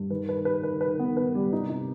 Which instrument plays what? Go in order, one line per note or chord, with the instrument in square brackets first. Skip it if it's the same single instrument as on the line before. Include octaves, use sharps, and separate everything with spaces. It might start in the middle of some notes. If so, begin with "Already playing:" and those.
Already playing: [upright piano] G2
[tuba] D#3 [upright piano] B4
[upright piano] B4
B4
B4
B4
B3
B4
G3
[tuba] C3 [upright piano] D#4
[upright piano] D#4